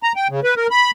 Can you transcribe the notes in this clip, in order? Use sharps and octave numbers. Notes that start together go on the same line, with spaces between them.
A#5
G5
C#3
B4
A#4
B5